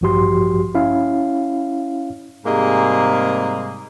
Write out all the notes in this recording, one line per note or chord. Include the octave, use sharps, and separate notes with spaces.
A1 G2 F3 F#4 G4 C6
C#4 E4 C#5 F5
G#2 C3 G3 A#3 G#4 D#5